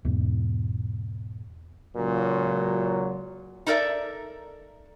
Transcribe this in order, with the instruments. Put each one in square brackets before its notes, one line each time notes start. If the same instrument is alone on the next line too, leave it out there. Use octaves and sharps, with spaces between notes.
[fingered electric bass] E2 G#2 B2
[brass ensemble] C#2 A#2 C#3 F#3
[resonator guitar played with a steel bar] D#4 A4 A#4 D5 E5